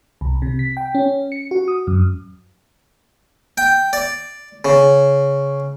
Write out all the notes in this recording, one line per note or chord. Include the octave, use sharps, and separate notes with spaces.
C2
C3
B6
G5
C#4
C#7
F#4
D#6
F#2
G5
D5
C#3